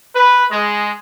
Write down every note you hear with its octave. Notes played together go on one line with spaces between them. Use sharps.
B4
G#3